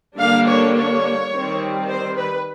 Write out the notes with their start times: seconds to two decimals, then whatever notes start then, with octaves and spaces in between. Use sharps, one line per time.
0.18 D3 G3 A#3 D4 F5
0.46 C#5
0.75 C#5
1.31 D#3 G3 C4
1.88 C5
2.17 B4